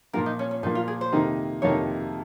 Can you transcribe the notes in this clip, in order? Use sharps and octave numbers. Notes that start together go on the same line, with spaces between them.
A#2 F3 A#3 A#4
D#4
C#4
C#4
A#2 F3 A#3 D#4
F4
G#4
C5
F2 C3 D#3 A#3 D#4
F2 C3 D#3 A#3 C#4 D#4 C#5